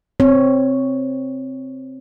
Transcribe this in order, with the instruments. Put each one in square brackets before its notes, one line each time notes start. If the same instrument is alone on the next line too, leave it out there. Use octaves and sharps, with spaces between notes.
[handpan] C4 C#5